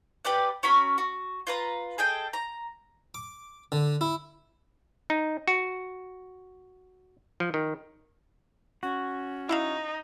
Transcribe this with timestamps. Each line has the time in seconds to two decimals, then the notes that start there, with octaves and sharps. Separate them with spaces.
0.25 G4 B4 D5 F#5
0.63 C#4 F#4 A#4 B5
0.98 F#4
1.47 F4 B4 A#5
1.98 G#4 A4 D#5 G5
2.33 A#5
3.14 D6
3.72 D3
4.01 E4
5.10 D#4
5.48 F#4
7.40 F3
7.54 D#3
8.83 C#4 F#4
9.49 D#4 E4 E5 F5